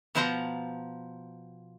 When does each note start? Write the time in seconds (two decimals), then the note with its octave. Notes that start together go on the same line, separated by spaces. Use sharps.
0.15 B2 F3 B3 C5 F#5 A#5